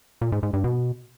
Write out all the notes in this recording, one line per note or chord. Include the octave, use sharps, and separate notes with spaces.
A#2
G#2
G#2
G2
B2